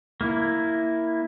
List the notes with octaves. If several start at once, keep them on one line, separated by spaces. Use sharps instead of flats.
A#3 E4